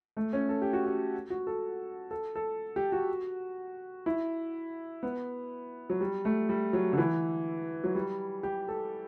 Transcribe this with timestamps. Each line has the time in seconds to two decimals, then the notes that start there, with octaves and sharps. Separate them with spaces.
0.17 A3
0.33 C#4
0.49 A4
0.62 G4
0.73 F#4
0.86 G4
1.30 F#4
1.47 A4
2.11 A4
2.36 A4
2.76 G4
2.92 F#4
4.06 E4
5.03 B3
5.90 F#3
6.01 G3
6.25 A3
6.49 G3
6.73 F#3
6.93 D3
6.98 E3
7.84 F#3
7.95 G3
8.43 G4
8.68 A4